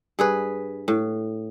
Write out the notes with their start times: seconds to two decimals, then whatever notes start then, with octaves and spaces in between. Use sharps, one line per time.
0.19 G2 G#4 B4
0.88 A2